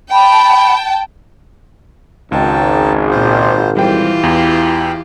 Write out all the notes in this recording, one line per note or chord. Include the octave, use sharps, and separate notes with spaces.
G5 A5 B5
G#1 C#2 D#4 G5 A5
A#2 F4 C5
E3 G3 F4 G4 C5 G5
E2 F5 G5 B5